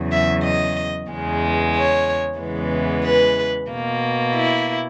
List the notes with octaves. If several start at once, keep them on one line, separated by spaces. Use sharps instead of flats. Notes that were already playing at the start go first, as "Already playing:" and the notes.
Already playing: E2 C#3 F#3
E5
D#5
E2 C#3 G#3
C#5
E2 C#3 E3 G#3 B3
B4
B2 A#3
E4